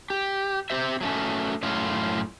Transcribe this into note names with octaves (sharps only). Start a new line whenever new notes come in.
G4
C4 G4 C5 E5
F#3 A3 C#4
F#2 A2 C#4 F4